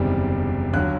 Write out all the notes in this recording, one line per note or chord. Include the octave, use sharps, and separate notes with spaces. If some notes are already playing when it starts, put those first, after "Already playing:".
Already playing: F#1 E2 C3 D#3 G3
D#2 D3 F#3 F#6